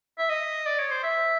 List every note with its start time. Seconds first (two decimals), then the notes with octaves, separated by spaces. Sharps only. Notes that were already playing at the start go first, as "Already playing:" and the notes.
0.18 E5
0.29 D#5
0.66 D5
0.79 C#5
0.91 C5
1.04 E5